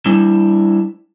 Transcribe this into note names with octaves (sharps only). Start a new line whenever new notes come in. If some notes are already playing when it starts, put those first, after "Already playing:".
G3 D4 E4